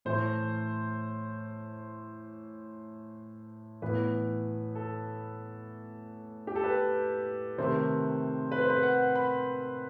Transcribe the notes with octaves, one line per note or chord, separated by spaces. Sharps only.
A2 E3 A3 C5
A2 E3 B3 B4
A4
G4
A4
B4
C3 D#3 A3 C4
B4
C5
B4
F#5
B5